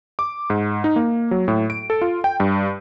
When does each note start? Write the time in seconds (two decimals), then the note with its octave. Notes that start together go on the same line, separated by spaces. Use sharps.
0.19 D6
0.50 G#2
0.84 D#4
0.96 A#3
1.31 F#3
1.48 A2
1.70 D7
1.90 A4
2.02 F4
2.24 G5
2.40 G2